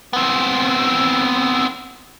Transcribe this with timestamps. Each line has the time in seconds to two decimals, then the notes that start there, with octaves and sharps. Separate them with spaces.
0.13 B3 C4